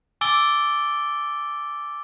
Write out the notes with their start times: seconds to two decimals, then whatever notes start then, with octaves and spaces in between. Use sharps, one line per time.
0.21 G#5 D6 E6 A6 D7 G7